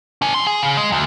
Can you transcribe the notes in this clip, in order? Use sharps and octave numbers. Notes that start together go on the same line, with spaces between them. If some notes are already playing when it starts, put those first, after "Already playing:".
D4 G#5
F2 C6
G#4
C#3
G#3
D2